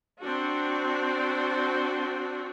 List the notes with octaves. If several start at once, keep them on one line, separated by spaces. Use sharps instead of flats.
C4 D4 F#4